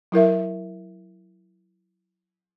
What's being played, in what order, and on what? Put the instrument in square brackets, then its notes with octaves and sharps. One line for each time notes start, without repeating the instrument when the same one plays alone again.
[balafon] F#3 E4 A#4 E5